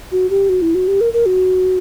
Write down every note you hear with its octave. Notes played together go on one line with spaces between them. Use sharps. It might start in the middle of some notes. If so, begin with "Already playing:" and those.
F#4
G4
F#4
E4
F#4
G4
A#4
A#4
F#4